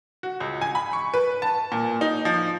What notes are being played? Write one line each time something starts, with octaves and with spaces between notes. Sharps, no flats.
F#4
C#2
G#5
B5
C#6
B4
A5
A#2
D#4
F3